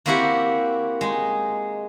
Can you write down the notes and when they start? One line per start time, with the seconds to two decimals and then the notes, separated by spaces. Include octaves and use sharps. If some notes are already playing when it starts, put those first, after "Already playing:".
0.06 A#3 C4 E4 F#4 G4 F#5
1.01 G#3 D#4